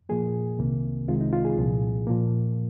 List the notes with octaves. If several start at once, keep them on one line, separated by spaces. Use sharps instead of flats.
A#2 F3 A#3 G#4
C2 C3 D#3 A#3
C2 C3 D#3 G#3 F4
D#4
F4
G#4
C2 A#2 F3
A#2 F3 A#3